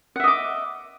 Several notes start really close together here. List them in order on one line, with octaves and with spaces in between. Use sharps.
F#5 E5 D#5 D6